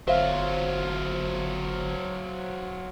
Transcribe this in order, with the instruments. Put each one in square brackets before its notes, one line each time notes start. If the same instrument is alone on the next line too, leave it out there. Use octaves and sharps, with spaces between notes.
[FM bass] G1 [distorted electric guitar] F#3 F4 [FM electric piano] C5 [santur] E5 F5